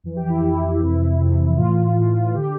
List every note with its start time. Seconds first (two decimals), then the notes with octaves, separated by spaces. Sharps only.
0.04 F2 E3
0.16 G4
0.29 E4
0.42 F2 E3 E4
0.80 F2 C3 E3 E4
1.19 F2 C3 E3
1.57 A2 E3 F4
1.96 A2 E3
2.35 D3 G4